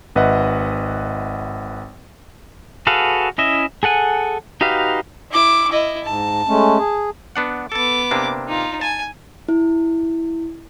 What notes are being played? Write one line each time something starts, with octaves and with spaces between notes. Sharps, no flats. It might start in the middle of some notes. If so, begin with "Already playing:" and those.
G#1 B4 D#5 E5 F#5
F#4 G#4 A4 B4 F5
C#4 E4 D#5 E5
G#4 A4 F#5 G#5
D#4 F#4 G4 B4 F5
E4 D6
E4 D#5
G#2 A5
G#3 A3 C#4
G#4
B3 D4 F#5
B3 A4 A5 D6
C3 A#3 D4
D#4 F4
G#5 A5
E4